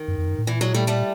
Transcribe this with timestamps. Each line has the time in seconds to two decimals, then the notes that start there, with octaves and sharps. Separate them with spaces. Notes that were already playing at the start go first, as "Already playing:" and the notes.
Already playing: D#3
0.08 F#2
0.18 F2
0.28 F#2
0.38 A2
0.47 A#2 E3
0.61 F#3 G#3
0.74 G3 A3
0.87 G3 A3